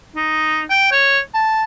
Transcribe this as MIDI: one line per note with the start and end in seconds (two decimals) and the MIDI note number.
0.16 0.63 63
0.69 0.87 79
0.92 1.19 73
1.34 1.64 81